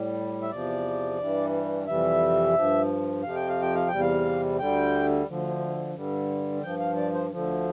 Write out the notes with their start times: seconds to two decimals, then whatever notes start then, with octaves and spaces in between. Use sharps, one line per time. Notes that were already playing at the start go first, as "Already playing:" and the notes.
Already playing: A2 G3
0.42 E5
0.50 E2 C3 F3 D5
1.19 G2 E3 G3
1.87 F2 C3 E3 G3 E5
2.55 G2 F3
3.23 F2 C3 F3 F5
3.36 G5
3.49 F5
3.62 G5
3.75 F5
3.88 E2 C3 G3 G5
4.01 F5
4.59 D2 D3 G3 G5
5.27 D2 D3 F3
5.95 G2 D3 G3
6.63 G2 F3 G5
6.80 F5
6.97 D5
7.14 C5
7.31 D2 D3 F3